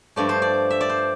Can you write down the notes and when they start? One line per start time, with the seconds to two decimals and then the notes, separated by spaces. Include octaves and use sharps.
0.16 G2 F3 A3 D5
0.29 C5
0.42 D5
0.70 E5
0.81 D5
0.89 C5